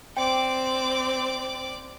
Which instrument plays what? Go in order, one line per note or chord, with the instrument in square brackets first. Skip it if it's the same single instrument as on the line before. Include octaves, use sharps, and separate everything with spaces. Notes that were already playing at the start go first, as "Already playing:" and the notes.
[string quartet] C4 [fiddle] D5 D6 [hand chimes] G5